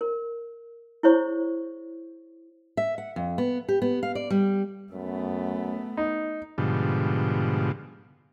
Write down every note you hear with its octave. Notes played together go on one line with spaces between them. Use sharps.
A#4
E4 G#4 C5 C#5 C#6
E5
F#5
F2
B3
G4
B3
F5
D5
G3
F#2 A3 B3
D#4
G#2 B2 D3 F3 G3